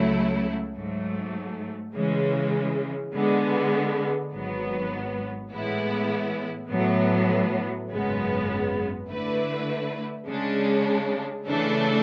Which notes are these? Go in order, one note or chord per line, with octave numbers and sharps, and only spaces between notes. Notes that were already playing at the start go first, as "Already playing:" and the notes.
Already playing: C#2 C#3 F#3 A3 E4
G#2 F#3 A3
C#3 E3 G#3
D3 G#3 B3
G#1 G#2 F#3 B3
A2 E3 G#3 B3 E4
A2 F#3 B3
G#1 F#2 C#3 G#3 B3
D3 A3 E4 B4
C#3 G#3 D4
C#3 E3 A3 D4 A4